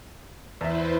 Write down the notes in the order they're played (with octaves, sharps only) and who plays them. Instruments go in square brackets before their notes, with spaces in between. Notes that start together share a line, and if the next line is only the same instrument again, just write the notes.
[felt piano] E2 E5 [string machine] E4 B4 C5